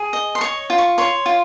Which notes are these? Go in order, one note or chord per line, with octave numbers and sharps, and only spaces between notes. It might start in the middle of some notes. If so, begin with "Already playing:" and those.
Already playing: G#4
D#5
C6
C#5 C#6
F4
C#6
C#5 C6
F4